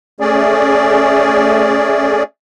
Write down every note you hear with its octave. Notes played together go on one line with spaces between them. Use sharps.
A3 C#4 G#4 D5